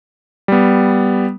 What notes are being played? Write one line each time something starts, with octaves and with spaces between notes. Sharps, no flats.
G3 B3